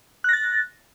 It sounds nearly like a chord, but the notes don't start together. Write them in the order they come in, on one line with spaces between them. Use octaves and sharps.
F#6 A#6 A6